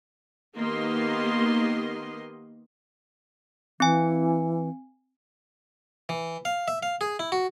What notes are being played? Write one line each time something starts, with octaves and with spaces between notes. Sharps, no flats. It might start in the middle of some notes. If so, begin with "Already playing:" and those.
D#3 A#3 B3 G4 D#5 C6
E3 C4 G#5
E3
F5
E5
F5
G#4
E4
F#4